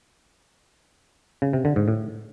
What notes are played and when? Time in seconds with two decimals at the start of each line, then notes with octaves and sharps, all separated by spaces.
1.42 C#3
1.53 C3
1.65 D3
1.76 G#2
1.88 A2